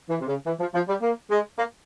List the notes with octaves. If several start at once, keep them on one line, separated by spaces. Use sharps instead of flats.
E3
C3
C#3
E3
F3
F3
G3
A#3
G#3
A#3